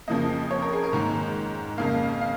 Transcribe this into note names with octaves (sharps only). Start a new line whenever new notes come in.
F2 C#3 F3 A#3 D#5
C#5
A#4
G#4
A#4
G#2 D#3 A#3
F2 C#3 A#3 F5
F5